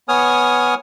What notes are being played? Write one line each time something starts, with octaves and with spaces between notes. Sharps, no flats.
B3 C#5 G#5 D#6 F6